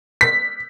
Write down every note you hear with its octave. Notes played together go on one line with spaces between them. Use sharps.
B6